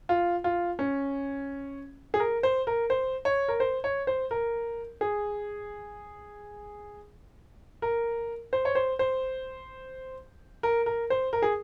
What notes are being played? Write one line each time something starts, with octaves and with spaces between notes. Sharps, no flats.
F4
F4
C#4
G#4
A#4
C5
A#4
C5
C#5
A#4
C5
C#5
C5
A#4
G#4
A#4
C5
C#5
C5
C5
A#4
A#4
C5
A#4
G#4